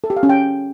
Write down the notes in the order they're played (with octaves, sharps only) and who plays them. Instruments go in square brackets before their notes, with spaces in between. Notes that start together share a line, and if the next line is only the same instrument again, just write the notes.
[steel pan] A4
G4
F5
C#4
G5